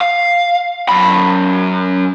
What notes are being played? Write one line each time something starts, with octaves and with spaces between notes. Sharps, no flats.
F5
F#2 B5